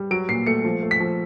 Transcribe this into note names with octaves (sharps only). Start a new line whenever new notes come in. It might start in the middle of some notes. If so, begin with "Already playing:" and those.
Already playing: G3
F#3 D7
A#2 C7
A3 C#7
F3
A3
B6
F3